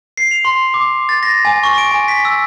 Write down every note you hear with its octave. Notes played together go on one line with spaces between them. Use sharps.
C7
F7
C6
D6
A6
A#6
G#5
C#6
D7
G#5
B6
E6